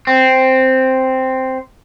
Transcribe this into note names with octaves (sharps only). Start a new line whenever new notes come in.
C4